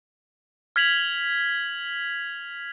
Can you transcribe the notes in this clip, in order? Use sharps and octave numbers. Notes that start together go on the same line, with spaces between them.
F6 G#6 B6 F7 F#7